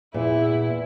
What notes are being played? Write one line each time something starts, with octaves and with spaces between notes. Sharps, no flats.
E2 A#2 E4